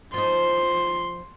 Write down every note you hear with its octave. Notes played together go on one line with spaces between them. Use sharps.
F3 D#4 C6